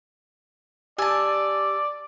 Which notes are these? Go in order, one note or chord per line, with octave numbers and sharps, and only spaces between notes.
G4 D5 G#5 A5 E6